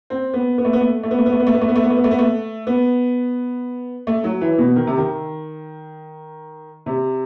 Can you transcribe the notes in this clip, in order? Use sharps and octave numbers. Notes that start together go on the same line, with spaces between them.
C4
B3
B3
A3
B3
A3
A3
B3
A3
B3
A3
B3
A3
B3
A3
B3
A3
B3
A3
B3
A3
B3
A3
B3
A3
F#3
E3
B2
D#3
C3
D#3
C3